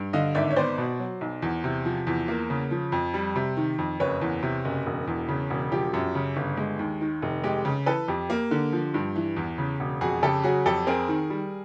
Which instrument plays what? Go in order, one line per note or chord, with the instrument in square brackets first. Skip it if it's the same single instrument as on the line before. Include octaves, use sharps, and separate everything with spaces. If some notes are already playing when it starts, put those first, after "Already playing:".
Already playing: [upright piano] G2
D3 D#5 F5
G#1 D5 E5
C#5
B3 C5 D5
B2
F#3
B1
E2
C3
F3
E2
A#3
C#3
F3
F2
G3
C3
D#3
F2
F#1 B4 C#5
E2
C3
F#1
E1
E2
C#3
E1
F3 G4
F#2
C#3
G1
G#3
D#2
D#3
F1
G#3 G4
C#3
E3 A4 B4
F2 G4
A#3
D3
F3
G2
E3
E2
C#3
E1
F2 F#4 G#4
C#3 G4 A4
F#3 F#4 G#4
F2 G4 A4
C4 G#4 A#4
D#3
G3